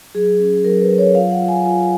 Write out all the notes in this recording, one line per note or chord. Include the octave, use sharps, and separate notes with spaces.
F#3 G#4
C#4
F#3 A#4
B4
F#3
C#5
F4 F5
F#5
F4
G#5
F4 G#5